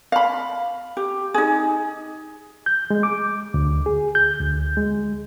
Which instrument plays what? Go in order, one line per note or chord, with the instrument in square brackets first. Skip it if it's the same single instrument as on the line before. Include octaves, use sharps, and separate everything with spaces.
[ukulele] F5 B5
G4
D#4 G#4
[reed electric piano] G6
G#3
D6
D2
G#4
G6
D2
G#3